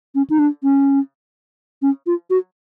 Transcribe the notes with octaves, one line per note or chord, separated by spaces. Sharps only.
C#4
D#4
D4
C#4
C#4
F4
F#4